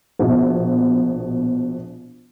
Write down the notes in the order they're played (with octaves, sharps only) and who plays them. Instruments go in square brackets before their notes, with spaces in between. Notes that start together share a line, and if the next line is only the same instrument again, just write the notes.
[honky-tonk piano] A#1 B2